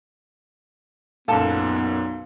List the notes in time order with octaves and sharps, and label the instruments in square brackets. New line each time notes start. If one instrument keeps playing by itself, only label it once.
[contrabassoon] B1 [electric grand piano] F#2 A#2 [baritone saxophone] B3 [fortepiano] F4 A4 A5